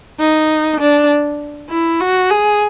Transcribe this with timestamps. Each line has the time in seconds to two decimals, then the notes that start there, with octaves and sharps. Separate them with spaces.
0.20 D#4
0.80 D4
1.70 E4
2.00 F#4
2.30 G#4